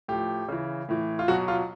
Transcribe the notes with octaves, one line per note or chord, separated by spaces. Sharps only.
A2 F3 G4
C#3 E3
A2 E3
F4
B2 F#3 F#4
F4